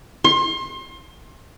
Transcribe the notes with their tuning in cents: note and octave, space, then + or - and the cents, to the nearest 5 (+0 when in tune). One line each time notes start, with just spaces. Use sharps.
C6 +30